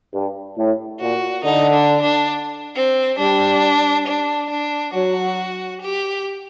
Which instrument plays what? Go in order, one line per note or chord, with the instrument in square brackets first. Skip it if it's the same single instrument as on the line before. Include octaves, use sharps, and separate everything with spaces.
[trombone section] G2
A2
[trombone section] A#2 [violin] F#4
[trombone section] D3 [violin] D#4
[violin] D4
D4
C4
[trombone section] G3 [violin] D4
[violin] D4
D4
[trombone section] F#3 [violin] F#4
[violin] G4